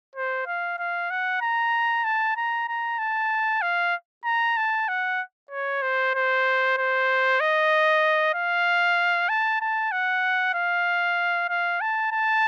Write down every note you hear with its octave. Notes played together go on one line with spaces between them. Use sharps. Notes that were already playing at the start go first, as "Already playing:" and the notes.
C5
F5
F5
F#5
A#5
A5
A#5
A#5
A5
F5
A#5
A5
F#5
C#5
C5
C5
C5
D#5
F5
A5
A5
F#5
F5
F5
A5
A5